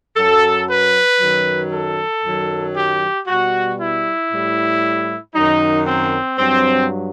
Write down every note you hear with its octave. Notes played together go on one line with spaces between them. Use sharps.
F#2 F#3 A4
B4
F#2 D#3 F#3
A4
F#2 D#3 F#3
G4
B2 G3 F#4
E4
A2 G3
F#2 D#3 F#3 D#4
C4
G2 F#3 C4